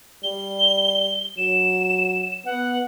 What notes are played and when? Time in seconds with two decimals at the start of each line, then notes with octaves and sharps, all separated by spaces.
0.23 G3 G7
1.37 F#3 E7
2.45 B3 F#5